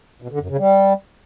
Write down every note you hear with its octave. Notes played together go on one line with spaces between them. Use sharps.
B2
D3
F#2
C#3
G3